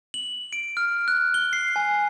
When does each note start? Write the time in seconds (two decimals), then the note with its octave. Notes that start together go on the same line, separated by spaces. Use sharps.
0.14 F#7
0.53 D7
0.77 F6
1.08 F#6
1.34 G7
1.53 C7
1.76 G#5